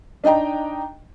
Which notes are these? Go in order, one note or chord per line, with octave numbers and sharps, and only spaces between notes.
D4 D#4 D#5 G5 A#5